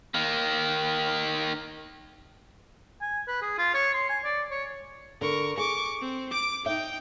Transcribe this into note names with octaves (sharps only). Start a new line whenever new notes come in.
D#3 A#3
G#5
B4
G#4
F4
C#5
C6
G#5
D5
C#5
D3 A#4 C#6
G#4 C#6 D6
C4
D6 D7
D#4 E5 G5